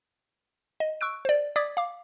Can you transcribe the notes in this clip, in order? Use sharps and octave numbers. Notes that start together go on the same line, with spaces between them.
D#5
C#6 E6 F#6 D7
C5 D5
D5 D6 D#6 G#6 A6 B6
F5 D6